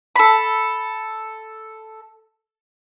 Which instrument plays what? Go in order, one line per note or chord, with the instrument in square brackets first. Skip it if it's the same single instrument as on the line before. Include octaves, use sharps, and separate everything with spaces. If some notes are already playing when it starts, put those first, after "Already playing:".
[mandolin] A4 B5